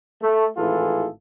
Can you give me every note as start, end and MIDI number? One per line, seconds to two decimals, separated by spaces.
0.22 0.46 57
0.57 1.07 32
0.57 1.07 45
0.57 1.07 52
0.57 1.07 65
0.57 1.07 68
0.57 1.07 69